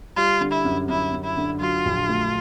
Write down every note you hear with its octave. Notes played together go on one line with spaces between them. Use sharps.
G3 F4
D3
E4
F#2
F#2 E4
F#2
E4
D3
F#3 F4
A#1
A3